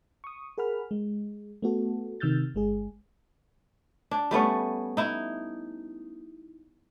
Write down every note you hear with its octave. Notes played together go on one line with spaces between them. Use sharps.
C#6 D#6
G#4 A#4 F#5 B5 F6
G#3
A3 B3 F#4 A4
C3 D#3 E6 F6 G6 A6
G1 G#3 G#4
D4
G3 A3 B3 C#4
D#4 E4